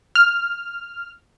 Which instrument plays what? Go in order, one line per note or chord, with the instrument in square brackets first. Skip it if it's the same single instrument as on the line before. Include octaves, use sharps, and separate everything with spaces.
[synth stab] F6